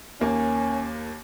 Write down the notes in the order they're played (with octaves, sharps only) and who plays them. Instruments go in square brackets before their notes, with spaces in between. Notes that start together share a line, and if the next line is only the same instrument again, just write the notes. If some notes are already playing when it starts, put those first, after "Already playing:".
[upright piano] D#2 A#3 [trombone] C#4